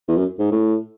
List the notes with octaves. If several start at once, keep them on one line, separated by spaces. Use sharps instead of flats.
E2
F#2
G#2
A2